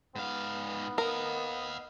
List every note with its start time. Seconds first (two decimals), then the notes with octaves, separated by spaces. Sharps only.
0.16 G#2 B3 F5
0.98 A#4 D#5 F5